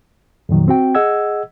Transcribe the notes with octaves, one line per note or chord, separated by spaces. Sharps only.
F2 A#2 D#3 F#3
C4 F#4 G5
G#4 D#5 F#5 E6 G#6